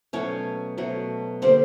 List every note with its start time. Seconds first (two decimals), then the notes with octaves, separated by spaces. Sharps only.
0.13 B2 F#3 A3 C#4 C#5
0.78 B2 F#3 A3
1.42 D3 G3 A#3 C4 C5